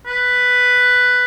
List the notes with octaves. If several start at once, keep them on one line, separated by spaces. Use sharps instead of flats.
B4